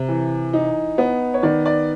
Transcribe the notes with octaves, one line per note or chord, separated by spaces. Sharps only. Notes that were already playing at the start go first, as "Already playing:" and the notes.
Already playing: C3
E3
D#4
B3
C#5
D#3 D5
D5